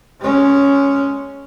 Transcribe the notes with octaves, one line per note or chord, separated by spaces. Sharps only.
G#3 C#4